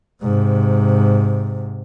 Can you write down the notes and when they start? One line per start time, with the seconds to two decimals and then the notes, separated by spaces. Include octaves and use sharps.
0.22 G#2 C3